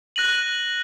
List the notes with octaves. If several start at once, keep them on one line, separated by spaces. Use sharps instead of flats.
F#6 A#6 D#7 F#7